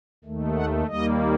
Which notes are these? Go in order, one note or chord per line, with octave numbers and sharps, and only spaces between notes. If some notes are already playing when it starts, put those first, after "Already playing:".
D#2 D#3 A3
F#5
D#2 D#3 G3 A#3 D#5